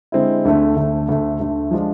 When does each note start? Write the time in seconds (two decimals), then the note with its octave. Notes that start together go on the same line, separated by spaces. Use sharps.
0.12 D3 G#3 C4 E4
0.45 D2 D3 A3
0.76 D2 D3 A3
1.09 D2 D3 A3
1.40 D2 D3 A3
1.71 F3 G#3 D4 F4